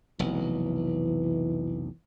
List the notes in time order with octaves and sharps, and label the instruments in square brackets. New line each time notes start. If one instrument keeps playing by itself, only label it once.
[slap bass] F1 B1 [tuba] E3